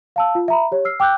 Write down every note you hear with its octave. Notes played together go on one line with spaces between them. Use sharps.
F5 A5 E6
F4
E5 A#5 B5
G4 C#5
E6 F6 C7
G5 D6 E6 F#6 G6